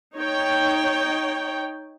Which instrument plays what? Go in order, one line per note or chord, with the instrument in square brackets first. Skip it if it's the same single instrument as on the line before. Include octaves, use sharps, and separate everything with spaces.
[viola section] D#4 C#5 G5